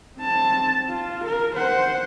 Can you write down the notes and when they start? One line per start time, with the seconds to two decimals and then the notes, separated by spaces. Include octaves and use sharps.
0.18 C4 A5
0.89 F4
1.25 A#4
1.56 C5 F#5